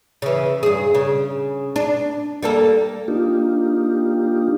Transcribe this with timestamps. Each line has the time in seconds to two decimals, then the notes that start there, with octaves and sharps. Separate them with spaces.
0.22 C#3 E3
0.63 G2 G#4
0.95 C#3
1.76 D4
2.43 G3 A#3 A4
3.08 A#3 D4 D#4 F4 G4